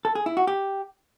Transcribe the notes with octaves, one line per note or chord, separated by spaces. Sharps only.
A4
G#4
E4
F#4
G4